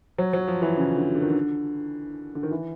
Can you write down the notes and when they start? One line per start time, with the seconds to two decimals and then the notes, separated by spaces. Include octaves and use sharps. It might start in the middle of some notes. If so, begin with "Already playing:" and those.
0.18 F#3
0.33 F#3
0.48 F3
0.62 E3
0.77 C#3
0.96 D3
1.15 D3
1.22 D#3
1.30 D3
2.35 D3
2.43 D#3
2.51 E3